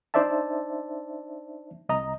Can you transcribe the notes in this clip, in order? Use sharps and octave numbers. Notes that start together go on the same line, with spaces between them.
D4 D#4 C5 D5 E5 A5
C2 D#5 A#5